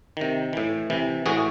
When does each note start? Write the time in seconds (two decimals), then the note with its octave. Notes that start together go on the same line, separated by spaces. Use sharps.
0.17 C3 D#3
0.53 A2 E3
0.90 C3 E3
1.26 A2 E3 F#4 G#4